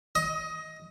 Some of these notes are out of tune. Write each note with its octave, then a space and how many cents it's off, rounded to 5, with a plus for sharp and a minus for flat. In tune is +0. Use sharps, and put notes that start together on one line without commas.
D#5 +15 D#6 +35